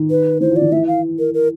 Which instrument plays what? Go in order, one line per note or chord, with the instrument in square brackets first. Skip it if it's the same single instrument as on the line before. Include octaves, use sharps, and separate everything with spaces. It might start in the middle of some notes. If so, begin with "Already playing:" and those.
Already playing: [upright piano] D#3
[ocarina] B4
[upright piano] E3 [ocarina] C5
[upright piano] F3
[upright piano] D#3 [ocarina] D5
[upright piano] E3 [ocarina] E5
[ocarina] F5
A#4
A#4